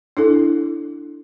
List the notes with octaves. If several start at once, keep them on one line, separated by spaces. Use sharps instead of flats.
D4 E4 A4